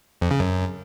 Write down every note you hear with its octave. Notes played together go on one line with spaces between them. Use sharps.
F2
C#3
F#2